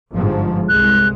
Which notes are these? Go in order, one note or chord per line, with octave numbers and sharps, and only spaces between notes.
G1 G#2 F3
C2 G#3 F#6